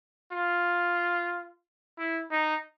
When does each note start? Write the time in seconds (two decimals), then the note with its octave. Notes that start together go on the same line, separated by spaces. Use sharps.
0.32 F4
1.98 E4
2.31 D#4